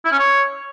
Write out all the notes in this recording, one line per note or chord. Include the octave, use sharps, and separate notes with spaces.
E4
C#4
C#5